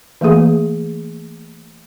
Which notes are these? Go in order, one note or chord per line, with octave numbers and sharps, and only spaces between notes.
E3 A3 A#3 G#4